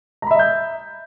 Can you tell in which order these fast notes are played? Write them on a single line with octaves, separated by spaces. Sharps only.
A#5 B5 E5 D#5 G6